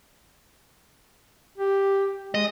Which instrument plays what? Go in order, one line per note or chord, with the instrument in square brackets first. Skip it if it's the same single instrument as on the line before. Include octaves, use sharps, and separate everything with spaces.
[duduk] G4
[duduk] G#3 [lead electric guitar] D#5